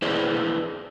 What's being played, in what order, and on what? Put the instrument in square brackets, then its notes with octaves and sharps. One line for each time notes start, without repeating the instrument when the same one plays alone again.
[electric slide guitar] D4 E4 G#4 B4 C5 D5